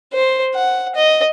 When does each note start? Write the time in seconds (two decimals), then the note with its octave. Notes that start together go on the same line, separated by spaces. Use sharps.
0.14 C5
0.55 F#5
0.95 D#5